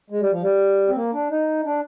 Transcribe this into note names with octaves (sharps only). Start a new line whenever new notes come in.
G#3
G3
F3
G3
C4
A#3
D4
D#4
D4